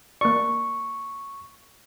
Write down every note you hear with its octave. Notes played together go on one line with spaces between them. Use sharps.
A#3 D5 C#6